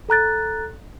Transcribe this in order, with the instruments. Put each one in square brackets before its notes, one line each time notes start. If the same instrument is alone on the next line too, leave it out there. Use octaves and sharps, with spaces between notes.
[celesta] A4 A#5 F#6 A6